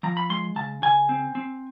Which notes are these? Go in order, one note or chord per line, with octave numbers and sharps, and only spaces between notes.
F3 A#5
B5
G#3 C6
C#3 A5
C#3 G#5
C4
C4